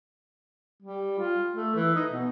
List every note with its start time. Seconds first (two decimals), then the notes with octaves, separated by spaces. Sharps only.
0.82 G3
1.18 F4
1.53 A3
1.75 E3
1.95 D#4
2.11 B2